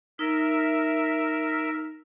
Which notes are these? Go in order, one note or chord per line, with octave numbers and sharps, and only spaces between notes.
D#4 A#4 E5